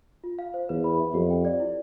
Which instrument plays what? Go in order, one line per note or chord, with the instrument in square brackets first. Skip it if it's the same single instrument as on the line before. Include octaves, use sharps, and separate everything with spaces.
[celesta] F4
F5
C5
[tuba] E2 [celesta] B4
[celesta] B5
E5
[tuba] F2 [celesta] G4
[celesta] G5
D5
E4